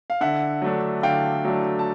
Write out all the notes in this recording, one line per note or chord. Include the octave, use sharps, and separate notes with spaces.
F5
D3 E5 F#5
F#3 A3 D4
D3 F5 G5
F#3 A3 D4
A5